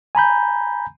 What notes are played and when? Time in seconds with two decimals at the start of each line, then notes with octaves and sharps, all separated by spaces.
0.15 G#5 A#5 B5 G6